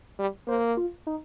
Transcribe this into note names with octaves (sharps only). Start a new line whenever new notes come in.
G3
A#3 C5
F4
D#4